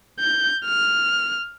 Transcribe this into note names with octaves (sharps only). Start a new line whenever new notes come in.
G6
F6